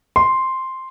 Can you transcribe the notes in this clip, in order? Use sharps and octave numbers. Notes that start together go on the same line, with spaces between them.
C6